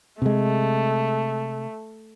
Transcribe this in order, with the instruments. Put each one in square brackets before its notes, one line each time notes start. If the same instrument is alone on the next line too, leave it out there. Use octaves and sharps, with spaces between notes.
[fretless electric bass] C3 G#3 [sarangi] A3